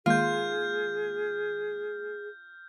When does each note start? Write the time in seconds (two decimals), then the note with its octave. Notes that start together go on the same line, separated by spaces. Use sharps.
0.06 D#3 G#3 A#3 F4 G#4 F6 G6